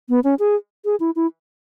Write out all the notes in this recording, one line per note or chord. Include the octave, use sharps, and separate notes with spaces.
B3
C#4
G#4
G#4
E4
E4